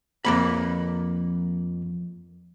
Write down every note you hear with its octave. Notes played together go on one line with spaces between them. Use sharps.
F2 A#3 B5